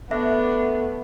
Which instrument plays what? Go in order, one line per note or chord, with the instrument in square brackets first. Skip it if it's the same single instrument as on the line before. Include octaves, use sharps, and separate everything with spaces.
[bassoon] A3 [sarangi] B3 [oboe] D4 [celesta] E5